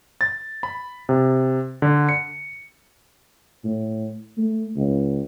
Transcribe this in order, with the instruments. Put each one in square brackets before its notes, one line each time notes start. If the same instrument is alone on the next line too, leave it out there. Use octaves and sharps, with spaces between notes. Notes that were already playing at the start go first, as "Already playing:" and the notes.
[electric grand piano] A6
B5
C3
D3
C#7
[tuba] A2
A3
C#2